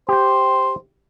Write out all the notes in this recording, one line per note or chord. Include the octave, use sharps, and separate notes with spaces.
G4 C5 G5